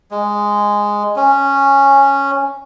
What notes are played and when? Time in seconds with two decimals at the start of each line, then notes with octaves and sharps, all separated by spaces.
0.11 G#3
1.16 C#4